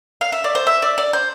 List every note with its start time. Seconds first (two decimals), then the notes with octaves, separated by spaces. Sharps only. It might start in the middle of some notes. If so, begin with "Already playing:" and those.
0.21 F5
0.32 E5
0.44 D5
0.55 C5
0.67 E5
0.82 D5
0.98 D5
1.13 C5